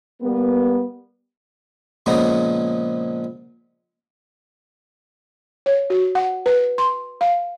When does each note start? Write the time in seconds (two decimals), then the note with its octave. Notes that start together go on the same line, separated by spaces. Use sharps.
0.22 G3 A#3 B3
2.06 A#2 C#3 F3 G#3 A#3 B3
5.66 C#5
5.90 F#4
6.15 F#5
6.46 B4
6.78 C6
7.21 F5